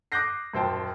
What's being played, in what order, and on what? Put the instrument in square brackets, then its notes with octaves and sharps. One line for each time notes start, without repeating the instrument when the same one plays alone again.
[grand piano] D6 D#6 F#6 G6 A#6 C7
D#1 F#2 C5 G5 A5